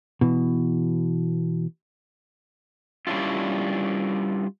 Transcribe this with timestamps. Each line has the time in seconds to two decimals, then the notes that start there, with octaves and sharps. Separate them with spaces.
0.21 B2 E3
3.07 G3 C#4 D4 E4 F4